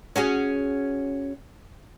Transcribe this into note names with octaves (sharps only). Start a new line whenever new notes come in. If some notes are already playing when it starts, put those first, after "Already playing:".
C#4 F#4 G#4